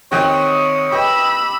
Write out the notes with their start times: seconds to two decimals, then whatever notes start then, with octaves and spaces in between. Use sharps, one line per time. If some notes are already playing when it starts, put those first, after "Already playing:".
0.11 C3 D#3 C4 C#5 D#5 F#5 G5
0.92 G4 B4 D#5 G5 B5 E6